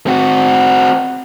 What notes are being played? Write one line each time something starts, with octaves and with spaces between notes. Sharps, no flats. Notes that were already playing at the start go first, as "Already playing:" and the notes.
C4 F#4